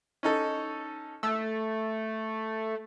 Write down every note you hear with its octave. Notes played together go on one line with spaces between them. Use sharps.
C#4 D#4 A4
A3 E6